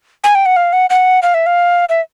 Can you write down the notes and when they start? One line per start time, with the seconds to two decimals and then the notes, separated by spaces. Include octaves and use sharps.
0.24 G#5
0.35 G5
0.46 F#5
0.56 F5
0.73 F#5
0.90 F#5
1.23 F5
1.34 E5
1.46 F5
1.89 E5